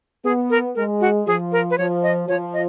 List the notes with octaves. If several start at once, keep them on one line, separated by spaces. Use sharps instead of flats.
B3 G#4
A#4
G#3 A#4
F#4
F3 G#4
A#4
B4
F3 C#5
D#5
F3 C#5
D#5